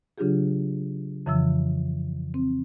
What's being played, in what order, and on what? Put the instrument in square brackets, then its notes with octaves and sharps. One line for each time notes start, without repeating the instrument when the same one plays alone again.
[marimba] C#3 F#3 D4 F4 G4 G#4
F2 C#3 E3 F3 E6
C4